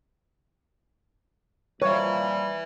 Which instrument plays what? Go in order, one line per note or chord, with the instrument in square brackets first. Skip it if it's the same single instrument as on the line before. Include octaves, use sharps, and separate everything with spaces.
[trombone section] A#2 F3 [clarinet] G3 [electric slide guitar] B4 E5 [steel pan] C#5